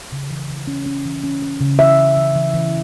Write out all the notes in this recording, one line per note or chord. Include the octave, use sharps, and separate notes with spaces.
C#3
E3
E3
C#4
C#4
E3
C#4
C#4
C#3
E3 E5
E3
E3
E3
E3